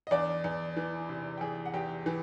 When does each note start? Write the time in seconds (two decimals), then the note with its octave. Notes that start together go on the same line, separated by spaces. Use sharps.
0.07 D#5
0.11 E2 D4 D5
0.44 E2
0.77 E3
1.09 C3
1.38 G5
1.41 E2 G#4 G#5
1.66 F#5
1.74 E2 G4 G5
2.06 E3